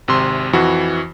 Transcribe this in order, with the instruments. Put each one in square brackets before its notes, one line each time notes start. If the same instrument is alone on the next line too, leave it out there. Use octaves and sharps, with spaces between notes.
[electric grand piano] G#1 C3 C6
F2 E3 F#4